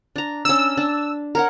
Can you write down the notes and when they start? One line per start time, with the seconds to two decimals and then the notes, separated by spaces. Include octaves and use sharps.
0.16 D4 A#5
0.45 C#4 D4 E6
0.77 D4
1.35 A#4 C#5 F#5